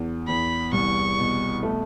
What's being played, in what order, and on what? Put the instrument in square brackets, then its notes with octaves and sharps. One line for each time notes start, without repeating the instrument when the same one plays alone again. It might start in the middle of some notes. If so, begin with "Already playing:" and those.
Already playing: [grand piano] E2
[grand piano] E2 [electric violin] B5
[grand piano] C2 [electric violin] C#6
[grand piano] B2
A3